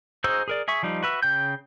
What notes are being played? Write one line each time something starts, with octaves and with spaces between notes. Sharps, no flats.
D#4 F#4 G#4 C5 E6
G#4 A#4 D5
G#4 E5 C#6
F3 G3 D#4
F#4 B4 E5
C#3 G5 G6